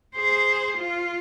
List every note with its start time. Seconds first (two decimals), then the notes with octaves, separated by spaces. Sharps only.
0.16 G#4 C5
0.77 F4